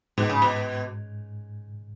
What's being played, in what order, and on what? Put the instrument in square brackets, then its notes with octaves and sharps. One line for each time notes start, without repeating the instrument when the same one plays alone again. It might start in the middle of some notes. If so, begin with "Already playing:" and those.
[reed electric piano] G#2 [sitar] B2
[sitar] C#3
B2